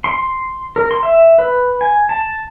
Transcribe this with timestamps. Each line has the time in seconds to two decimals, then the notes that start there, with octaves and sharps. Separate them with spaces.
0.04 C6
0.76 A#4
0.91 C6
1.03 E5
1.38 B4
1.81 G#5
2.09 A5